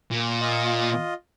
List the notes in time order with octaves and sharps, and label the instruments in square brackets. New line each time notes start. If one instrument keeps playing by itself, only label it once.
[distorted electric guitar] A#2
[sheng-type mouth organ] F4 D#5